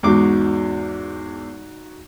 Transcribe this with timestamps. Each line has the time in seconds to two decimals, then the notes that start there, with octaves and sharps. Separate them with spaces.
0.03 E2 G#2 D#4 F#4 D6